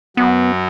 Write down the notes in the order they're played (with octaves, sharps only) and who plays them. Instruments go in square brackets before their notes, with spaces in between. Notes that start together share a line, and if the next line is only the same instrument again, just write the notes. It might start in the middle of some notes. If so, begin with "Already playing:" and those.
[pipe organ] F#2 F#3 [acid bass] B3